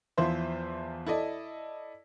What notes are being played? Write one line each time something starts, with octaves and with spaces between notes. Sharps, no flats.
E2 F3 E4 F4 C5 E5
E4 A4 D5 D#5